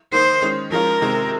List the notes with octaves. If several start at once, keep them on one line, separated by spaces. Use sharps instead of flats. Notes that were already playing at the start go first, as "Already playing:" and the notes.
D#3 A#3 D#4 C5
D#3 G#3 C#4
F3 G#3 C#4 F4 A#4
C3 D#3 G#3 C4